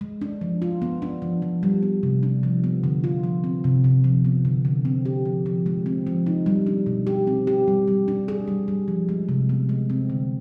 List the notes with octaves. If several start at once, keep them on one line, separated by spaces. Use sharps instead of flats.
G#3
D4
F3
F4
B3
D4
F3
F3
G3
B3
C3
D4
F3
B3
D3
F4
F3
C4
C3
C3
F3
B3
D3
D3
C4
G4
F3
F3
G#3
C4
F3
D#4
G3
D4
B2
G4
C4
G4
G3
G3
D4
G#4
G3
G3
F3
G#3
C3
B3
G#3
C4
D3